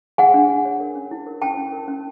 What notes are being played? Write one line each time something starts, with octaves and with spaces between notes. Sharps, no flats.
G#4 F#5 G#5
D4
D4
C#5
A#4
C#4
E4
A#4
C#4 G5 A5
C#4
A#4
C#4